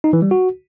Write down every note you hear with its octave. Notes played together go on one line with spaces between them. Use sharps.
D#4
E3
G3
F#4